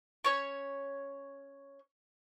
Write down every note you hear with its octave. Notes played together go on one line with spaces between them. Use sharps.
C#4 C#5 C#6